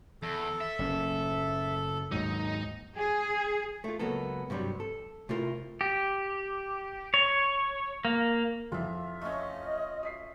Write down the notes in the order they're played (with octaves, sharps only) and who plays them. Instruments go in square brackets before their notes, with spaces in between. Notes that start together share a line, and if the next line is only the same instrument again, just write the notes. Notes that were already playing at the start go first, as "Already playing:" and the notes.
[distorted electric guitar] E2 [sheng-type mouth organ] A4
[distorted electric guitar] E5
[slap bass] F#1 A2 C#4
[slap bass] D#2 G#2 F#3 [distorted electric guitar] D#4
[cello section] G#4
[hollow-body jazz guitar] A3 F4
C#2 F#3 A#3 B3 A4
G2 C3 F#3 G3
A4
C3 A3 E4 F4 A#4
[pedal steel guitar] G4
C#5
A#3
[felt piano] F2 E3 [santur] F4 E5
[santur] A3 C#4 [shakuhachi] D#5
[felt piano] D#6 B6 C7